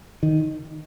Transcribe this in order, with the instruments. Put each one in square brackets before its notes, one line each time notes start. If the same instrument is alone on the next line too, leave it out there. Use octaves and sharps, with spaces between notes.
[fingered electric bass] D#3